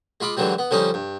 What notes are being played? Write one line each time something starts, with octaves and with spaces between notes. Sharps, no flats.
G#3 F4 B5 D6
G#2 D3 E3 F#3 G3
B3
D3 F3 G3 C#4 D#4
G2